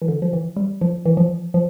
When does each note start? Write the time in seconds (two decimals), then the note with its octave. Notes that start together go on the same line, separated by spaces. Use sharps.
0.02 E3
0.08 D3
0.22 F3
0.33 E3
0.57 G3
0.81 F3
1.06 E3
1.17 F3
1.54 F3